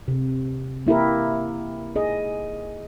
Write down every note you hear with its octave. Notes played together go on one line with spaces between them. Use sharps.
C3
A#3 E4 G4 A#4
G#4 D#5